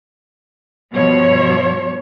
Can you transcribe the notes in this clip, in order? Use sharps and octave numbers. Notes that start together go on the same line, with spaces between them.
G2 B2 F3 C#5